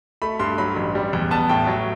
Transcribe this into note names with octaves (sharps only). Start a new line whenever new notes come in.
A3 B5
G2 C6
F#3 B5
A1
G3
E2
B3 A5
A2 G5
F#3